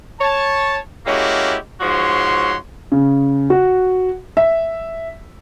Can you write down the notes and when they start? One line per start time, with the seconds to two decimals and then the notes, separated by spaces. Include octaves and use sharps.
0.20 C#5 A5
1.06 G#3 A#3 C#4 E4 F#4 G4
1.81 G#2 F3 F#4 C#5 C6
2.92 C#3
3.50 F#4
4.37 E5